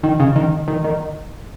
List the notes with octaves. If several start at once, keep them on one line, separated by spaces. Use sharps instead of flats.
D#3
C#3
D#3
D#3
D#3